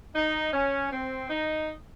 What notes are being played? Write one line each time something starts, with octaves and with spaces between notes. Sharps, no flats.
D#4
C#4
C4
D#4